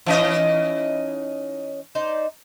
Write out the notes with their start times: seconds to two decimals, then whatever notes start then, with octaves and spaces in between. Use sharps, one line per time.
0.06 E3 C#4 D#4 D#5 E5
1.95 D#4 C5 D5